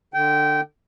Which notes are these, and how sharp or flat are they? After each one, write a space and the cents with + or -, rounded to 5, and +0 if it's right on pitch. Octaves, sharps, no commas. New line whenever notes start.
D3 +20 G5 -20